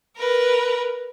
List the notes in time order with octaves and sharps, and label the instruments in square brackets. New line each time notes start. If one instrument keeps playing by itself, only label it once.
[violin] A#4 B4